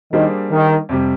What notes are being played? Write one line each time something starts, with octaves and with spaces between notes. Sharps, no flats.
D#3 G3 A#3 D4 G#4 C5
D#3
F2 C3 G3